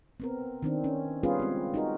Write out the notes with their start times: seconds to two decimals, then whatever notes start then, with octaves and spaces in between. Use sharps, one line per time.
0.20 B3 C4 A#4
0.62 D#3 C4 D4
0.84 C#4
1.23 G3 B3 C#4 F4 G#4 B4
1.39 G#3 C4
1.74 D#4 F#4 A#4